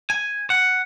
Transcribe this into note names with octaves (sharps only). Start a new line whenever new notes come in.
G#5
F#5